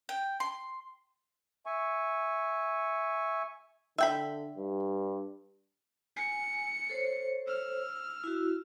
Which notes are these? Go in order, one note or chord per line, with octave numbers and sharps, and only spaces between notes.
G5
C6
E5 G#5 C#6
D3 E5 G5 B5
G2
G#5 C#7
A4 C5 C#5
E6 F6
E4 F#4